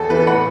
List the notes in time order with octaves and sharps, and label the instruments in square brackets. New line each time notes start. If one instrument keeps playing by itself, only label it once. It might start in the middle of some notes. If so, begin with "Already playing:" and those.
Already playing: [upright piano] E2 A4
E3 B4
A2 F#5 B5